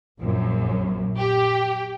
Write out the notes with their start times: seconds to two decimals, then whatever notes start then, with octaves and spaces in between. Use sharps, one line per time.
0.20 A#1 F#2
1.18 G4